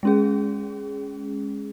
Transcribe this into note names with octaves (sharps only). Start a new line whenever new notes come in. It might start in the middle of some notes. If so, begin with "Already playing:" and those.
G#3 C#4 G#4